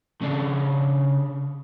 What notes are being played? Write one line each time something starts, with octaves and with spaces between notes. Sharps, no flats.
C#3 D4